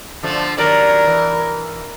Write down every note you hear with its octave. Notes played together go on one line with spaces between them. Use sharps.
D3 F3 A3
D#2 F#3 A#4 D5
E3